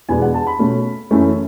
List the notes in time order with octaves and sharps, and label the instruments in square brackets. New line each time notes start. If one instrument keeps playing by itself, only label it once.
[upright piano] E2 B2 G#3 B3 D4 G#5
F#5
A5
B5
B2 A3 C#4
F#2 E3 A3 C#4